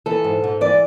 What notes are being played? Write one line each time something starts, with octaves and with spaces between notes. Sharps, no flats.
E3 A4
G#2
G#2
E3 D5